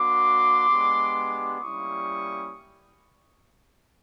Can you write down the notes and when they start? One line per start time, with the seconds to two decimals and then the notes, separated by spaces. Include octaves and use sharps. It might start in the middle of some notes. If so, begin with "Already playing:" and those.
Already playing: A#3 D4 F#4 C6 D6
0.67 G#3 B3 D4 G4
1.61 G3 A#3 C#4 E4 C#6 D#6